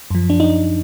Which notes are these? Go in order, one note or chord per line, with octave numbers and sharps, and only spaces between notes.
F#2 F3
D4
D#4